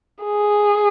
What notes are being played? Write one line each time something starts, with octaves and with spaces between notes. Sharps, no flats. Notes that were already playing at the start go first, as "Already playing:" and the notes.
G#4